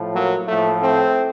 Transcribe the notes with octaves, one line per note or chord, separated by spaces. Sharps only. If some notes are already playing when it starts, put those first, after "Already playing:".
Already playing: A2 F3
F#3 A#3
A2 F3 A3
A3 C4